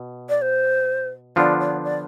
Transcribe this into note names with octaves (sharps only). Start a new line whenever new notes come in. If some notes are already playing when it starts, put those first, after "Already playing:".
Already playing: B2
D5
C5
D3 F3 B3 D4 F4 D5
D5
D5